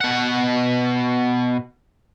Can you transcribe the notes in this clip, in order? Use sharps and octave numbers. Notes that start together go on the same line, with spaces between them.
B2 F#5